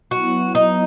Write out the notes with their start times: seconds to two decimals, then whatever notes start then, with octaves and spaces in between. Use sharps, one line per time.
0.11 F#3 B3 E4 F#4
0.55 D#4